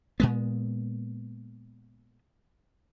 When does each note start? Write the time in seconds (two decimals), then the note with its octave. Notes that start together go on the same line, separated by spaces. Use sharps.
0.20 A#2 G#3 B3